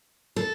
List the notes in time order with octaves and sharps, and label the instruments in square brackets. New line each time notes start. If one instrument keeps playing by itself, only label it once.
[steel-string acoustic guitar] A4